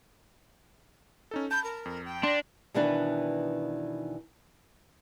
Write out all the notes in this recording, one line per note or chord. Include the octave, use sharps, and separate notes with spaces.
C#4 D#4 A4
A5 B5 G6
A#4
F2
G5
D4 C6 A6 A#6
B2 D#3 E3 B3 D4 B4